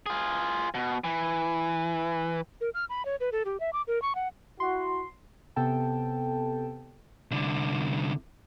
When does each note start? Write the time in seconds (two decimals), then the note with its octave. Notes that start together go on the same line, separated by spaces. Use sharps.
0.06 F4 G#4
0.74 B2
1.04 E3
2.61 A#4
2.74 F6
2.89 B5
3.05 C#5
3.20 B4
3.32 A4
3.45 G4
3.60 E5
3.73 D6
3.87 A#4
4.02 C#6
4.15 F#5
4.60 E4 F#4 C6
5.56 C3 B3 A4 G5 A5
7.31 C2 D3